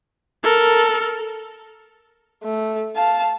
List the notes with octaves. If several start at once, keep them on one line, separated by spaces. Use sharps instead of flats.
A4 A#4
A3
F5 A5